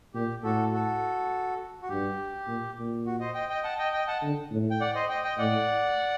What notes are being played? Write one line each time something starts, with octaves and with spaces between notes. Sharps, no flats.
A#2 G4
A2 F#4 A4
F#4 A4
F#4
G2 G4
A#2
A#2
F#4
C5 D#5
D#5 G5
D#5 G5
F#5 A5
D#5 G5
D#5 G5
F#5 A5
D3
A2
G5
D5 F#5
C5 D#5
D#5 G5
D#5 G5
A2 D5 F#5